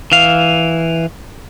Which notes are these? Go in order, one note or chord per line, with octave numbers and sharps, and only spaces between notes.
E3 F5